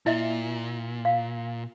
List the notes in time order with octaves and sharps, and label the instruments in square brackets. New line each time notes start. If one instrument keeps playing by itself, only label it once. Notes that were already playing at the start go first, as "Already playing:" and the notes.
[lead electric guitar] A#2 [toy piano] E4 D#5 E5
[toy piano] F5